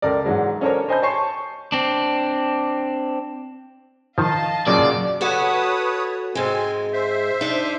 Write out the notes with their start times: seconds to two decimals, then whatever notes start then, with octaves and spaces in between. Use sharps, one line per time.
0.02 C#2 A4 A#4 D5
0.24 G#2 E3 F#3 G#3
0.61 C#4 D4 A4 A#4 C5 C#5
0.89 C5 D#5 G#5 A5 B5 G6
1.03 C#5 G#5 A5 C6 C#6 C7
1.72 C4 D4
4.18 D#3 F3 D#5 F5 A5
4.67 A#2 C#3 F#3 D5
5.21 F#4 A4 B4 C#5 F#5 D#6
6.35 G#2 G#3 C4 G#5
6.93 C5 E5
7.41 D4 D#4